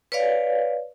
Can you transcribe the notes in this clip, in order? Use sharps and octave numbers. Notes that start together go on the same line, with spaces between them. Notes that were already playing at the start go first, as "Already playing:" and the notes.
B4 C#5 D5 F5